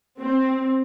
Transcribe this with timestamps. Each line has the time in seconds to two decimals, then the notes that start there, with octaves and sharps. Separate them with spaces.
0.21 C4